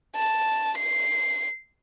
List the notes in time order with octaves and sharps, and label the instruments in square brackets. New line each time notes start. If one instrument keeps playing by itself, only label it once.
[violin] A5
C7